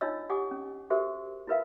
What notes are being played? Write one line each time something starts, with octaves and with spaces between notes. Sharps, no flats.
D4 D#4 F4 C#5 D#5 E6
G4 F#5 G#5 D6 D#6
C#4
F#4 G4 A4 A#4 C5 E5
E4 F4 A#4 B4 E5 F5